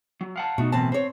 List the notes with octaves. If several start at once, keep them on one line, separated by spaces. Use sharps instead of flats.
F#3
F5 F#5 A5
B2 A3 D#4 F#4
F#2 A2 E3 C4 A5
C4 C5 C#5